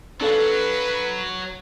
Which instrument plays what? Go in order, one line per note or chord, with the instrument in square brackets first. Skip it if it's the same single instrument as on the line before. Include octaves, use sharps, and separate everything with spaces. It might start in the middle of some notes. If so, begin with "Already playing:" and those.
[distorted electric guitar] F#3 [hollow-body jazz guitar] D4 A4 F5 [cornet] B4